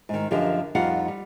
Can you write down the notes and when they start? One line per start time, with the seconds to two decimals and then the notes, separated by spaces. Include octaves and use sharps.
0.09 G#2 D#3
0.31 F#2 D3 F3 G4 A#4 D#5
0.75 F2 G3 D#4 F4 F5 F#5
1.08 G3